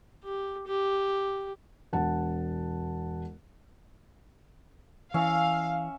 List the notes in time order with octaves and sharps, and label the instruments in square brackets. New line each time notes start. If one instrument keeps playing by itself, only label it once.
[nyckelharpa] G4
G4
[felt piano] E1 F#5 A5
[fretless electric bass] E3 [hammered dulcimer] C#4 E5 [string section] F5